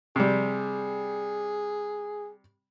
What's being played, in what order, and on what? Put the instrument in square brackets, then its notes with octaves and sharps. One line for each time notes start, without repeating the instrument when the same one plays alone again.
[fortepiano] C3 G3 [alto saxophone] G#4